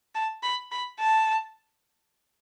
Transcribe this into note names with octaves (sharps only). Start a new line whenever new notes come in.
A5
B5
B5
A5